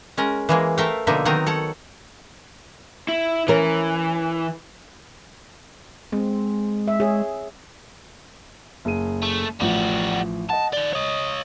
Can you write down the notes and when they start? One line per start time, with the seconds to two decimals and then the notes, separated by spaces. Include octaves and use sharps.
0.17 G#3 C#4 A#4
0.49 E3 G#3 A#3
0.78 A3 A#4 E5 F5 G5
1.07 B2 D3 F3 A#3 D#4 E5
1.25 D#3 F#3 B3 C4 D#4 A#4
1.46 A4 C#5 F#5
3.09 E4
3.48 E3 C#4 A#4
6.12 G#3 C4
6.88 E5
7.00 G#4 C#5
8.85 F#1 G#4 D#7
9.22 A3
9.61 A1 F3 G3 F#4
10.50 D#5 F#5 A5
10.73 D#3 D5 G7
10.93 C#5 D#5